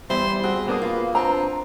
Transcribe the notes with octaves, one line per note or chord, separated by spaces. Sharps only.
E2 G3 E4 C5
C4 F#4 G#4
A#3 B3 D4 D#6
F4 B4 F5 B5
C4 D4 B4 A#5